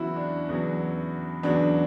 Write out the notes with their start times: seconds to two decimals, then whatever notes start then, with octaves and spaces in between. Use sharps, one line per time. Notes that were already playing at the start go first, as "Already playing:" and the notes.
Already playing: E2 C#3 F#3 E4 F#4
0.16 D4
0.49 E2 C#3 F#3
1.43 E2 C#3 F#3 D4